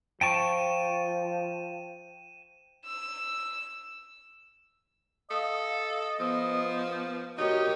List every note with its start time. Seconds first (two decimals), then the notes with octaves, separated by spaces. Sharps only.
0.21 F3 G5 A5 C#6 D#7 E7
2.86 E6
5.31 A4 D#5 F5
6.20 F3 B3
7.38 D#4 F#4 G4 A#4 C#5 D#5